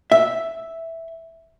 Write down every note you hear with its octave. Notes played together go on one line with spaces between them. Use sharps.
E5